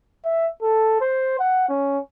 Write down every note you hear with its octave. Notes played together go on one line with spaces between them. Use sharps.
E5
A4
C5
F#5
C#4